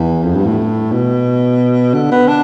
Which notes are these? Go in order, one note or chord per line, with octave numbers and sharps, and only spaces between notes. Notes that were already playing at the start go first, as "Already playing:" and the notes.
Already playing: E2
F2
G2
A2
B2
D3
B3
D4